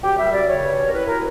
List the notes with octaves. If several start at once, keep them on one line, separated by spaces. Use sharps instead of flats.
F#2 G4
G3 E5
F#2 D5
C#3 C#5
G2
C#4
A#4
E4 B4
F#3 A#4